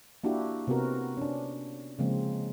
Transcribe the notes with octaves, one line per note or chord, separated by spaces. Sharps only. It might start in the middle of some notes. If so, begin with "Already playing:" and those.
A#3 D4 E4 F#4 G4
C3 B3 C4 F#4 A#4
C#4 D4
C#3 F3 G#3 A#3 C4